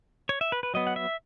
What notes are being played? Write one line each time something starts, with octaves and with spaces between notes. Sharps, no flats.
C#5
E5
B4
B4
F#3 B3 D#5
F#5
E5